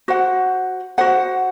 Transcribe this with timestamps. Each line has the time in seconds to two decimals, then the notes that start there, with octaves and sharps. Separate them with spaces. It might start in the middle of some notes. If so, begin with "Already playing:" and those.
0.08 F#4 C5 F#5
0.98 F#4 C5 F#5